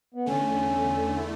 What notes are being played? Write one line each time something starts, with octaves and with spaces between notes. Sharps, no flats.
B3
E2 D3 A3 C#4
E4